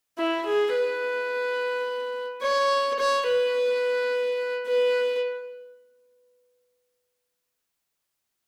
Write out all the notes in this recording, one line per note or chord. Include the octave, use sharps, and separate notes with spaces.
E4
G#4
B4
C#5
C#5
B4
B4